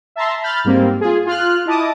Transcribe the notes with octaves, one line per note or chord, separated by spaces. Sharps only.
E5 A5 A#5 C6
B5 F6 G6 A6
G#2 G3 A#3 C4
F4 G#4
F4 F6 F#6
E4 D#5 A5 D6 D#6